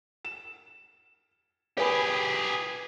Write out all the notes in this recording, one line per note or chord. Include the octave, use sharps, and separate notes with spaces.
E7
G4 G#4 B4 G#5 B5